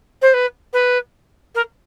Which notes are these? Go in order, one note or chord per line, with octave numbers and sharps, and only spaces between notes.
C5
B4
B4
A#4